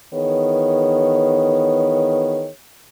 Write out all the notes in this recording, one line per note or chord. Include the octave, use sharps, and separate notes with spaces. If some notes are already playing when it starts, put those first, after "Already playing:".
D#3 E3 B3 G#4 C#5